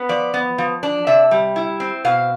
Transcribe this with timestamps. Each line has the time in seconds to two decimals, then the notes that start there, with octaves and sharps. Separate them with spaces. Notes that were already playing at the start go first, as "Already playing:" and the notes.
Already playing: B3
0.09 F3 D5
0.34 B3
0.58 F3
0.83 D4
1.07 C3 E5
1.31 G3
1.56 E4
1.80 C4
2.05 B2 F5